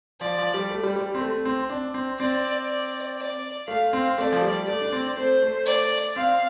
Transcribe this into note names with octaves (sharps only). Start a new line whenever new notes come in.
F3 D5
F3
G3
A3
G3
G3
C4
A3
C4
D4
C4
C4 D5
D5
D5
A3 F5
C4
A3 D5
F3
G3
A3 D5
D4
C4
A3 C5
A3
D5
C4 F5